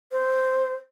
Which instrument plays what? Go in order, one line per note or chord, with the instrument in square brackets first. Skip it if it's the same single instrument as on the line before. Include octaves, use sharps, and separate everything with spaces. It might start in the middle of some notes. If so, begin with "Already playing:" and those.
[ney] C5